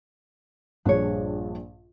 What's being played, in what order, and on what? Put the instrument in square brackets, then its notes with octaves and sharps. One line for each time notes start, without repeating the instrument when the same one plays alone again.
[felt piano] A#1 G2 G#4 [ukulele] D4 C#5